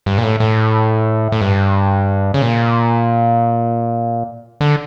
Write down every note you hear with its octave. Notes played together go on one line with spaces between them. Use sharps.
G2
A#2
A2
A2
A2
G2
C#3
A#2
D3